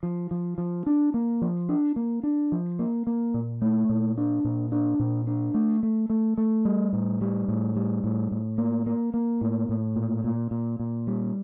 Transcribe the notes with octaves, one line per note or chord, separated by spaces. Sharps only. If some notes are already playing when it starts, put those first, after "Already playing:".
F3
F3
F3
D4
A#3
F3
D4
A#3
D4
F3
A#3
A#3
A#2
A3
A#2
D4
A#2
D4
A#2
D4
A3
A3
A3
A3
G3
A2
G3
A2
G3
A2
A2
A#3
A#3
A#3
A2
A2
A#2
A#2
A#2
A#2
G3